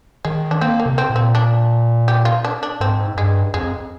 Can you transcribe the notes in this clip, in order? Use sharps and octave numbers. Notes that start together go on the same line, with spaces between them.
D#3 G#3
D4
A#3 C4
A#3
C3
C4
A#2
C4
D4
G4
F4
D4
D4
G#2 C4
G2 G#3
F2 G#3